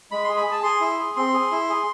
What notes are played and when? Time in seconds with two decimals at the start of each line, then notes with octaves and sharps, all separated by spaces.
0.11 G#3 B5
0.24 G#4 C6
0.37 B5
0.47 G#4 A5
0.63 G#4 C6
0.81 E4
0.99 G#4
1.16 C4 C6
1.34 G#4
1.52 E4
1.69 G#4